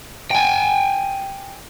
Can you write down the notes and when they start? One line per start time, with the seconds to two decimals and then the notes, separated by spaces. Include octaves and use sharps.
0.31 G5 G#5